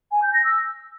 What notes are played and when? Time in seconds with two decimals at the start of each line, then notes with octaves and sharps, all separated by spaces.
0.11 G#5
0.22 G6
0.33 A#6
0.44 E6